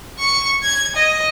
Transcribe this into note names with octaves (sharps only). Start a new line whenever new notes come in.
C#6
G#6
D#5